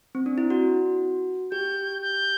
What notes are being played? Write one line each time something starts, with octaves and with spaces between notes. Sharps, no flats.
C4
D4
E4
F#4
G4 G6
G6